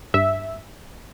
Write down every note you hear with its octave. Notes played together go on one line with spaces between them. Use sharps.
G2 E5